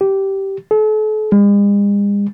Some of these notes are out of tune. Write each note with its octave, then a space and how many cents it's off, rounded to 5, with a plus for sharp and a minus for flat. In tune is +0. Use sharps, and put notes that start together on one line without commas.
G4 -10
A4 -40
G#3 -45